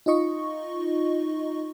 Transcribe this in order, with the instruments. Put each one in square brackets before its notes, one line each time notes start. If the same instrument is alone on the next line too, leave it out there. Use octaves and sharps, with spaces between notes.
[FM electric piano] D#4 F4 D#5 C#6